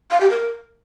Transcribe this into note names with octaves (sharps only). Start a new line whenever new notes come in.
F5
G4
A#4